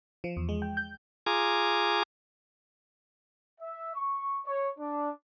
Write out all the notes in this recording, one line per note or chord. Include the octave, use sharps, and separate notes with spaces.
F3
E2
G#3
G5
G6
F4 G#4 G#5 A#5 D6
E5
C#6
C#5
D4